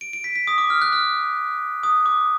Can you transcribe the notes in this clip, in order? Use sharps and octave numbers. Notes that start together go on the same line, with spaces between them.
D7
D7
B6
B6
D#6
D6
F6
F#6
F6
D#6
D6